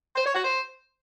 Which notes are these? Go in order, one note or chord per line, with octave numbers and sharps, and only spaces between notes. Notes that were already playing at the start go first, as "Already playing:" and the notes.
C5
C#5
F#4
C5